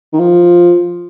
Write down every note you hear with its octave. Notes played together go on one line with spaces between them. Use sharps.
D#3
F3